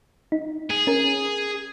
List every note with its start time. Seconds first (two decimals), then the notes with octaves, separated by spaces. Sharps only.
0.32 D#4
0.70 G#4
0.87 C#4 A#4